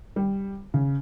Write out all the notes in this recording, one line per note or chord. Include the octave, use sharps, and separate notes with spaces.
G3
C#3